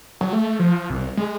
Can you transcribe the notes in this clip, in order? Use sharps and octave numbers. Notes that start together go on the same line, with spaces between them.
F#3
A3
F3
C2
G#3